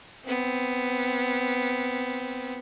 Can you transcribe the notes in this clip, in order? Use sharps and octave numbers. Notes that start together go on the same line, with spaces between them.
B3 C4